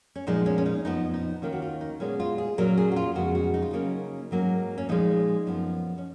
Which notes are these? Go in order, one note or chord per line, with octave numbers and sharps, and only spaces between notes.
C#4
A#2 F3 G#3 B3 D#4
C#4
C#4
D#4
F2 F3 B3 D#4
D#4
D#2 D#3 A#3 C#4 F4
F#4
F4
D#4
A#2 G#3 B3 C#4
F4
G#4
A#2 F#3 C#4 A#4
G#4
F#4
F4
F2 C#3 G#3 B3 F#4
F#4
D#4
F4
C#3 F#3 A#3 C#4 D#4
G#2 F#3 A#3 C#4
C#4
A#2 F3 G#3 D#4
F#2 F3 B3
C#4